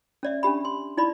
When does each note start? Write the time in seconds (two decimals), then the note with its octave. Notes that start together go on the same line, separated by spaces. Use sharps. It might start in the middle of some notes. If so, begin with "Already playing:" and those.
0.23 C#4 D5 E5
0.43 C#4 D4 G4 B5
0.65 C6
0.97 D#4 E4 D5 B5